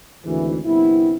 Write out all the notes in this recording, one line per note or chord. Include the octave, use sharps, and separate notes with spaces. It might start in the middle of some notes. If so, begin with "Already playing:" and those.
G#1 D2 G#2 E3
G1 C2 B3 C4 E4